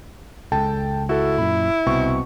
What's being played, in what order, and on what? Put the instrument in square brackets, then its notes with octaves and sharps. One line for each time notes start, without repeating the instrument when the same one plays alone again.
[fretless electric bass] C#2 G#3 [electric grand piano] A4 G5 A5
[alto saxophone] E4 [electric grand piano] F#4 A4
[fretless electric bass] F#2 A#2 [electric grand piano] B5
[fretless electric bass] C2 [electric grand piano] B2 C4 C#6